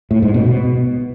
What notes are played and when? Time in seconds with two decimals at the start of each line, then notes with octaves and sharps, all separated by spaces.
0.11 A2
0.22 G#2
0.34 B2
0.46 B2